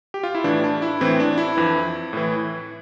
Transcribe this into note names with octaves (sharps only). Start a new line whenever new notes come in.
G4
F4
E4
A2 E3 D4
D4
E4
A2 E3 C4
D4
E4
F2 E3
A2 E3